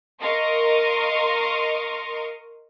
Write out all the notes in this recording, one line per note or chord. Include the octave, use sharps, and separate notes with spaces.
A#4 D#5 F5 C6 C#6 D#6